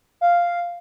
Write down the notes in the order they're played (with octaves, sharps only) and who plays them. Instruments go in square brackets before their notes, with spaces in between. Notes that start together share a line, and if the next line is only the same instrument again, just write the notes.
[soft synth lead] F5